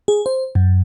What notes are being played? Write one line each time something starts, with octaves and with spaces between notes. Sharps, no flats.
G#4
C5
F#2